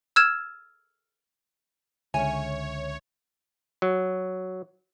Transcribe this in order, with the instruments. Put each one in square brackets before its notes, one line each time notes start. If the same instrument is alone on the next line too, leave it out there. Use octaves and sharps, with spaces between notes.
[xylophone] E6 F6 G#6 E7
[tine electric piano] C#2 D3 [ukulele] C#4 G#5 [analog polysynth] C#5 [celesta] E5
[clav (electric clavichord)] F#3